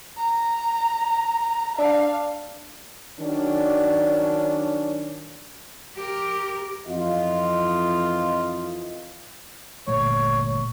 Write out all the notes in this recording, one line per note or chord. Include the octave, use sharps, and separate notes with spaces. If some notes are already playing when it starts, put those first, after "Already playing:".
A#5
D4 F5
D#3 F#3 C#4 D4
G4 A#4
F2 E3 F4 D#5
G1 A#2 A3 C#5